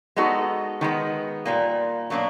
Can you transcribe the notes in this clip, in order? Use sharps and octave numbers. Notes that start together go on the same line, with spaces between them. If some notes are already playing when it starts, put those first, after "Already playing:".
G#3 B3 D#4 F#4 A4
D#3 G#3 B3
A#2 G3 A#3
B2 F#3 A#3 D4